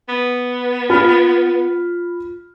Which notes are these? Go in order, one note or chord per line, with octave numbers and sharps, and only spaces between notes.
B3
F4 B5 F6